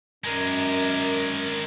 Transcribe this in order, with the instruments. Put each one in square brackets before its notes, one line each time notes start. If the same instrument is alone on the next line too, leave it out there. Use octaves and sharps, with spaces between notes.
[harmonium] F#2 [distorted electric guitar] D#3 G#3 [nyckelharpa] A#4 D5